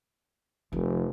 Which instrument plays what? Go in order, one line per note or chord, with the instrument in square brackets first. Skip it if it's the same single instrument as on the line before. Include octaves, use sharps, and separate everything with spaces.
[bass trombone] F1 [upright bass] F3